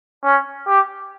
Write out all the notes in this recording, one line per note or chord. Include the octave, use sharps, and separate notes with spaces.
C#4
G4